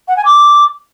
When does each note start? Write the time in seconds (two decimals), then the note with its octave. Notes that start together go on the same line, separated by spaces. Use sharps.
0.08 F#5
0.17 G#5
0.25 D6